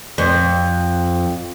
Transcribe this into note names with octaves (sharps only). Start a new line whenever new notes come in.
F2